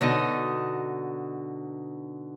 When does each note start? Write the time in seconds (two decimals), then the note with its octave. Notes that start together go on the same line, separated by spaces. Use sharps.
0.01 B2 D3 D#4 D#5